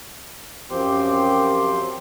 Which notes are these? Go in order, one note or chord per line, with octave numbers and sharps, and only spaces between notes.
F#2 F3 C4 G4 C6